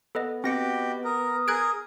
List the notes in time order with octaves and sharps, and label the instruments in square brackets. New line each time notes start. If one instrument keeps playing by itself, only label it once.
[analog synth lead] B3 [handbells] A4 B4 D#5
[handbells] C4 A#6 C#7 [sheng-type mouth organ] F#4 G4 [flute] D#5
[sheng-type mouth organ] A#4 [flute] D#6
[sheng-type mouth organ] G#4 A#4 [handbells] F#6 G#6 D7